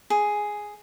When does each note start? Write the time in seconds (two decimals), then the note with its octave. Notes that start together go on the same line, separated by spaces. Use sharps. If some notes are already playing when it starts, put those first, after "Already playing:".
0.10 G#4